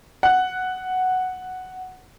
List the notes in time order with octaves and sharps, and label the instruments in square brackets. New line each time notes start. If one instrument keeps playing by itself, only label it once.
[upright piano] F#5 F#6